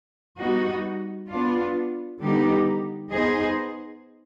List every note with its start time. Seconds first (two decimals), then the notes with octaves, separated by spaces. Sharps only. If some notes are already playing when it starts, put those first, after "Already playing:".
0.39 G3 B3 D#4 F#4
1.30 B3 D4 F4
2.21 D3 G3 B3 D#4 G4
3.12 B3 D#4 G#4 C5 D#5